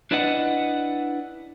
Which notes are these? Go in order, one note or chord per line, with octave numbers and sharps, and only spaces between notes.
D4 E4 B4 D5 D#5 F#5